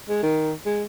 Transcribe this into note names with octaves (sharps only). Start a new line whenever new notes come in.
G#3
D#3
G#3